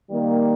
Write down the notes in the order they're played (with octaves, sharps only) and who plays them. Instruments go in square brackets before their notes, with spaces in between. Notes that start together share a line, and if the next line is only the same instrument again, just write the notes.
[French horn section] D#3 G3 A#3